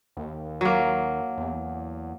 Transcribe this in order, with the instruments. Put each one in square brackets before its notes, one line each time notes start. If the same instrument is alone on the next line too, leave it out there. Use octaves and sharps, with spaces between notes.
[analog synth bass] D#2
[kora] F#3 A#3
[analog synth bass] E2